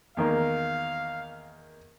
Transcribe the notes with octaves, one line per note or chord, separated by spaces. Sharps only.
E2 D#3 A#3 F5